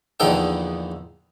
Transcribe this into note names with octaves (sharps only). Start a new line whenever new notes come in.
A#1 E2 D3 D#4 A4 G5